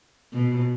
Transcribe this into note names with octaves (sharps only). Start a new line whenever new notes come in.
B2